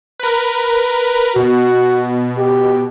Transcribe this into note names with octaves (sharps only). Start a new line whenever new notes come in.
A#4 B4
B2 F#4
G4